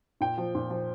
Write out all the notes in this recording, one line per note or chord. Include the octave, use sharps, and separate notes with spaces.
A#2 G5
F3
A#2
F3